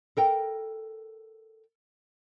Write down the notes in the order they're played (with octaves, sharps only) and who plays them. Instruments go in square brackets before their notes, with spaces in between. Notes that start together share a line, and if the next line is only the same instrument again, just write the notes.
[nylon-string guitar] A4 A#4 G5